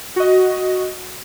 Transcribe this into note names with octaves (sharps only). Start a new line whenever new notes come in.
F#4 D#5